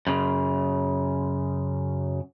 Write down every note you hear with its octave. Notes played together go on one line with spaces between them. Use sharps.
F#2 C#3